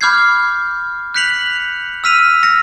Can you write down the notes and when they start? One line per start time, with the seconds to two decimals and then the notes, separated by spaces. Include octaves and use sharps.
0.01 B5 D6 F6 G6 G#6 C7
1.14 F#6 G6 B6 C#7 F7 F#7
2.04 E6 F6 B6 D#7 F7
2.43 F6 A#6 C#7